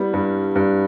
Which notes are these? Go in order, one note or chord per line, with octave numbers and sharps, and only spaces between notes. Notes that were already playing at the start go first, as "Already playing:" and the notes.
Already playing: G3 B3 E4
G2
G2